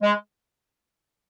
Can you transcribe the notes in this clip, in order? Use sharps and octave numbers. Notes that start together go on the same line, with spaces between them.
G#3